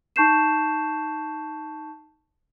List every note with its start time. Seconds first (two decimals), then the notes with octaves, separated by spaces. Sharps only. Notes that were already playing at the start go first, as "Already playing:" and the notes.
0.16 D#4 A5 C#6 G6 C7 E7